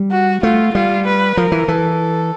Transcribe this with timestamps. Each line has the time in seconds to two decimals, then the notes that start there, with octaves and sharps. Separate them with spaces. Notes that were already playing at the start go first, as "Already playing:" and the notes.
Already playing: G3
0.11 F#4
0.43 A3 F4
0.74 G3 F4
1.06 B4
1.37 F3 A#4
1.52 E3
1.68 E3 A4